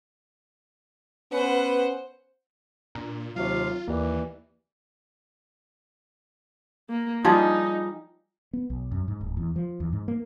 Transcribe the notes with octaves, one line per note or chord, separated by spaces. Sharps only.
B3 C#4 B4 C5 F#5
A#2 D4 A#5
D#2 C3 F#3 F4 C#5 F5
D#2 E3 A#3 G4 D5
A#3
F3 G3 D#4 G#4
B3
B1
F#2
G#2
D1
E2
F3
E2
G#2
A#3